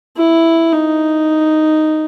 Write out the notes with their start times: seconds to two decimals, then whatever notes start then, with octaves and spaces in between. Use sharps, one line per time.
0.18 E4
0.72 D#4